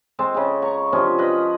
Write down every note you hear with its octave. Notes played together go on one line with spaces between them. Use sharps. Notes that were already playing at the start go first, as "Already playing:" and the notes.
G#3 C4 A5
C#3 G#4
C#5 A#5 C#6
C3 F3 C#4 D4
B4 D#5